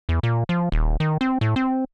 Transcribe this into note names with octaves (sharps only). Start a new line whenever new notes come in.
E2
A#2
F3
D#1
D#3
C4
A2
C4